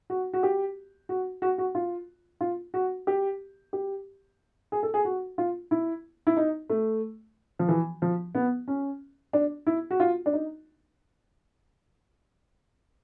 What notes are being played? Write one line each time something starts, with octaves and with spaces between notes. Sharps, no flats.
F#4
F#4
G4
F#4
F#4
F#4
F4
F4
F#4
G4
G4
G#4
A4
G#4
F#4
F4
E4
E4
D#4
A3
F3
E3
F3
B3
C#4
D4
E4
F#4
F4
D4
D#4